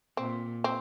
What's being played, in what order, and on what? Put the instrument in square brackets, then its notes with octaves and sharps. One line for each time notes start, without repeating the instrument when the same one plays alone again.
[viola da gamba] A#2 [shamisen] C4
[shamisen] C4